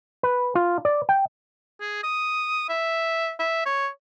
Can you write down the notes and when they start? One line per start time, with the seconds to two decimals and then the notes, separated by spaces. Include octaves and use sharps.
0.23 B4
0.55 F4
0.85 D5
1.09 G5
1.81 G#4
2.03 D#6
2.69 E5
3.39 E5
3.66 C#5